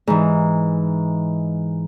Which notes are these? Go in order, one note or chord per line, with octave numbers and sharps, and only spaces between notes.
G#2 E3